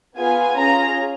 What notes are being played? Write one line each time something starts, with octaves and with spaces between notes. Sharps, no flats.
B3 F4 G#4 G#5
C#4 F4 G#4 A#5